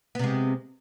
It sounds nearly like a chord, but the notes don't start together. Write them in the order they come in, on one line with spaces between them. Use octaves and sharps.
B3 C3 G#3